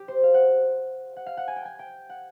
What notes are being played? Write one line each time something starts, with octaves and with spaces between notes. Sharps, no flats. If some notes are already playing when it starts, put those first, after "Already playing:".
Already playing: G4
C5
F5
F#5
F#5
F5
F#5
G#5
G5
G#5
G5
F#5